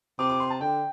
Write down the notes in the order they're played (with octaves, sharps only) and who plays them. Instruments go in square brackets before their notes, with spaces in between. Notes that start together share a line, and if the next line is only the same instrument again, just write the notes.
[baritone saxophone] C3 [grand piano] D6
[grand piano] D6
C6
A5
[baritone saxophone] D3 [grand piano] G5